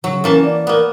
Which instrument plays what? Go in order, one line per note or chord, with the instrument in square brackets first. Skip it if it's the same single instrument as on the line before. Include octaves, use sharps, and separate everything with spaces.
[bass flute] C#3 [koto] F#3
[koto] E3 A#3 A5 [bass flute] C#4
[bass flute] D5
[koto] A#3 B3